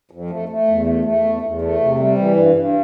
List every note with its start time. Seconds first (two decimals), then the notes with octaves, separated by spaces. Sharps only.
0.11 F2
0.30 A3
0.49 A3
0.68 E2
0.86 A3
1.05 A3
1.24 E2
1.42 E2
1.61 A3
1.80 C3
1.99 G3
2.18 E3
2.36 G2
2.54 G2